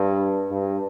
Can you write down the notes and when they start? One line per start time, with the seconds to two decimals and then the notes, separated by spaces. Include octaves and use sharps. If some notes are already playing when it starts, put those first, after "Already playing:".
Already playing: G2
0.51 G2